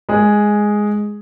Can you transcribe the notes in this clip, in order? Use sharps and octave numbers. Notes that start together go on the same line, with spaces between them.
G#3 G#4